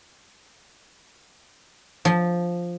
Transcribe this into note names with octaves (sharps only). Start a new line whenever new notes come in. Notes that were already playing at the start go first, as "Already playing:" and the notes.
F3